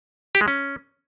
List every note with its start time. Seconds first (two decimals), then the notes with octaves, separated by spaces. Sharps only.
0.35 G4
0.41 G#3
0.48 C#4